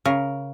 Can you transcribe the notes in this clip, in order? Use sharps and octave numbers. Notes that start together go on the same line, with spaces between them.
C#3 A#4